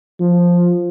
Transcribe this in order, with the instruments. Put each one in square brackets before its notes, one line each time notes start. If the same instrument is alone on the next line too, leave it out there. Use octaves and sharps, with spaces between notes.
[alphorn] F3